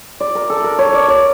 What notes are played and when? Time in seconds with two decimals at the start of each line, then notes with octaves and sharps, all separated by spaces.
0.20 D5
0.35 A#4
0.50 A4
0.64 A#4
0.79 C#5
0.94 D5
1.08 D5